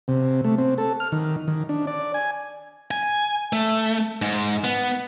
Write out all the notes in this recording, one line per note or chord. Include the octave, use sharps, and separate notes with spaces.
C3
A3
C4
A4
F6
D#3
D#3
D4
D5
G#5
G#5
A3
G#2
B3